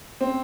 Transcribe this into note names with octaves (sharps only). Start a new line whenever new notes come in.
C4